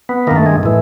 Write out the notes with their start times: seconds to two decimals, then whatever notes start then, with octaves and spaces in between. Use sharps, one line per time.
0.09 B3
0.27 G2 D#3 A#3
0.36 A3
0.46 G#3
0.63 A2 E3